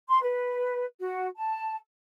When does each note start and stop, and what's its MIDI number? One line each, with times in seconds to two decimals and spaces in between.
0.08 0.19 84
0.22 0.86 71
1.00 1.26 66
1.36 1.76 81